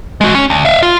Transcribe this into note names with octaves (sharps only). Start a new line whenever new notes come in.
G#3 F#4
C#4
D2
E5 F5
F4